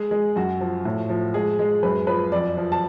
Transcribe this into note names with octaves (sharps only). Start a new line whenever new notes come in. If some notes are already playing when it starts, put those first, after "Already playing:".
Already playing: G#3 G#4
G#3
F#2 F#4
F3
A2
F3
G#3 G#4
G#3
F#2 B4
F3 B4
F2 D5
F3
A5